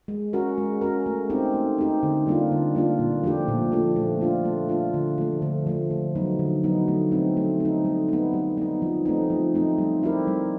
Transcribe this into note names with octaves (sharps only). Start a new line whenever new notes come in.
G#3
C#4 F#4 A#4
G#3
C#4 F#4 A#4
A3
C4 D#4 G4
A3
C4 D#4 G4
D3
G3 A#3 D4 F4
D3
G3 A#3 D4 F4
A#2
F3 A3 D4 G4
A#2
F3 A3 D4 G4
A3
D4 F4
A3
D4 F4
D3
F3 A3
D3
F3 A3
D3
F#3 B3 D#4
D3
F#3 B3 D#4
A3
C4 D#4
A3
C4 D#4
G3
B3 D#4
G3
B3 D#4
F3
A3 C4 D#4
F3
A3 C4 D#4
G3
C4 E4 G4 A#4
G3